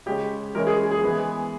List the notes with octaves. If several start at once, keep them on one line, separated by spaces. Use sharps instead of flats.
C#3 G#3 C#4 G4
E3 G#3 C#4 A#4
G#4
G#4
E3 G#3 B3